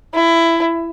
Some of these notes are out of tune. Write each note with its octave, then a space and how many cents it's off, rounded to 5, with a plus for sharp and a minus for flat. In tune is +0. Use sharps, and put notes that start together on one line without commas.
E4 +15